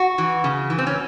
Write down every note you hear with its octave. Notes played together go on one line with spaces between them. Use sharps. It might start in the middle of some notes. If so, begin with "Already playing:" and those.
Already playing: F#4
E3
C#3
E3
C4
C#4